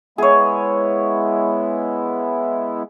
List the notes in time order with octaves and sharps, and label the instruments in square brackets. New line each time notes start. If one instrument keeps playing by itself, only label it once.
[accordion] G#3 B3 E4 [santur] G#4 C#5